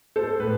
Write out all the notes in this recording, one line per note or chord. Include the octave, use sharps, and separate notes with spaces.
A4 C5
A2 B4